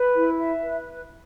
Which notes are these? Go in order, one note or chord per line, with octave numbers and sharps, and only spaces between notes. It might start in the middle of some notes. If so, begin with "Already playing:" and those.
Already playing: B4
E4
E5
B4